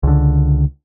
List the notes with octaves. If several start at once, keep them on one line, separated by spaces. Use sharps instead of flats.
C#2 D3